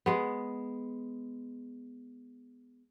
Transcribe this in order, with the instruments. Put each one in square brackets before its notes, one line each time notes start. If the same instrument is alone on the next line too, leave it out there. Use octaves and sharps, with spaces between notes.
[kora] G#3 B3